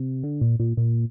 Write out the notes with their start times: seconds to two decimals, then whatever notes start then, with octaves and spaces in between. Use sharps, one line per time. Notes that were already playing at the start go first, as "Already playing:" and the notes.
Already playing: C3
0.23 D3
0.41 A#2
0.60 A#2
0.77 A#2